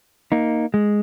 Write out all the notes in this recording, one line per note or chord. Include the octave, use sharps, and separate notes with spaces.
A#3 D#4
G#3